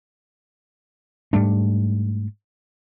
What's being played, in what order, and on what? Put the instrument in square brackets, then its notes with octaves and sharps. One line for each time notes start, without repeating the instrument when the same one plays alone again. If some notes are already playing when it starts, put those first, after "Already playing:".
[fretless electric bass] G#2 G3 A3 D4